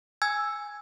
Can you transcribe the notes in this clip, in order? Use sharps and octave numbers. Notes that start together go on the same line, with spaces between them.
G#5 E6 G#6